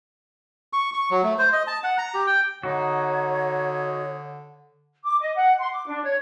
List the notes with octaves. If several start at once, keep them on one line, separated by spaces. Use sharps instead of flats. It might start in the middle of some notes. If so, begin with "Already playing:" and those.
C#6
C#6
F#3
A3
C5
D#5
A5
F#5
A#5
G4
G5
D3 D#4 F#4 C#5
D6
D#5
F#5
C6
D6
D4
C#5